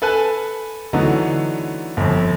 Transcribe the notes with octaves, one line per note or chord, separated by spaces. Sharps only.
A4 B4 G#5 A5 F#6
D3 E3 F#3 A3 B3 D#4
G1 F2